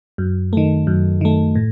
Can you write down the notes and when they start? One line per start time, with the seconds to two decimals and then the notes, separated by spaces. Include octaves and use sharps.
0.18 F#2
0.53 D#3 A3
0.87 F#2
1.21 D#3 A3
1.55 A2